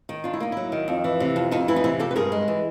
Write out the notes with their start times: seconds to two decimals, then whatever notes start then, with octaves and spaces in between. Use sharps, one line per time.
0.09 D#3
0.24 D4 F4
0.34 E4
0.40 A#3 D#4
0.52 F#3 E4
0.72 D#3
0.88 F2
1.04 E3
1.20 C3
1.36 F2
1.51 F2 D#4
1.68 E3 E4
1.76 D#4
1.84 C3 E4
1.99 F2 G4 A4
2.11 B4
2.16 G2 G#4 A#4
2.32 G#3
2.48 E3